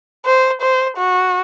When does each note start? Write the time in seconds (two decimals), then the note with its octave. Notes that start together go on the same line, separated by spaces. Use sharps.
0.25 C5
0.61 C5
0.98 F#4